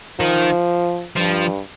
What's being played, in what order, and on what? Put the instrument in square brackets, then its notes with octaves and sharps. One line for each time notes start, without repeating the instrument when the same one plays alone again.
[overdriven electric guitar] D#3 [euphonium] F3
[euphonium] G2 [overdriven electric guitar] F3